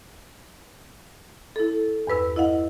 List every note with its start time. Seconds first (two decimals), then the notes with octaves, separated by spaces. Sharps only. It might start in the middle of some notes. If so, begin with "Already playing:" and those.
1.56 E4 A4
2.07 E2 G2 B4 E6
2.36 E4 D#5 F5 F#5